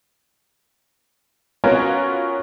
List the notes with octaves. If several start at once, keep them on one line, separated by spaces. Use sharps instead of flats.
B3 C#4 F4 F#4 A#4 C#5